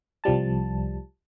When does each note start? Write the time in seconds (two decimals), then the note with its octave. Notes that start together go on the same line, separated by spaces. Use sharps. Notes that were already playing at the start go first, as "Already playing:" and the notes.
0.24 C2 F3 G3 A5